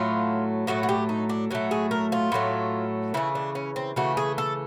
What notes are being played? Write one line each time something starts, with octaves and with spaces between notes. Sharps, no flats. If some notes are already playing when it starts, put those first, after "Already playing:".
Already playing: A2 F#3 A3 F4
A2 F#3 A3 F#4
F#4
G4
D#4
D4
A2 F#3 A3
G#4
A#4
F4
A2 F#3 A3
C#3 E3 A3 E4
D4
C#4
C4
C#3 E3 A3 F#4
G#4
A4